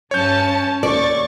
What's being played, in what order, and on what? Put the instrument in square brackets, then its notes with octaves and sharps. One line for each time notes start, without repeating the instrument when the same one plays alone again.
[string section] G2 C#4 A5 [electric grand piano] C#5 G6
[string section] D#2 C#6 A6 [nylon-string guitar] D5